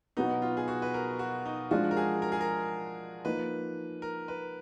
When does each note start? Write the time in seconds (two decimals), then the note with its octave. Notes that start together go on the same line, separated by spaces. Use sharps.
0.17 B2 F#3 B3 D#4
0.42 F4
0.57 G#4
0.68 F#4
0.82 B4
0.94 A#4
1.19 F#4
1.46 D#4
1.71 F3 G#3 D4 F4 F#4
1.91 A#4
1.97 G#4
2.22 A#4
2.32 G#4
2.41 A#4
3.25 F3 A#3 D#4 B4
4.02 A#4
4.28 B4